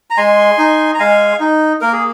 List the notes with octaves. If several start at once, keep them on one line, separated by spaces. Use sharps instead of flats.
A#5
G#3 G#5 C6
D#4
A#5
G#3 F5 G#5
D#4
A#3 A#4
G#4